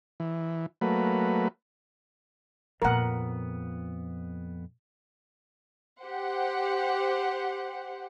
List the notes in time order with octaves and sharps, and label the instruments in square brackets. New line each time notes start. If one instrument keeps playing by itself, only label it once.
[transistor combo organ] E3
F#3 A3 A#3 B4
[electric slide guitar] F2 B3 [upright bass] A#2 A#3 [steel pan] A#4 F#5
[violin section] G4 C5 F#5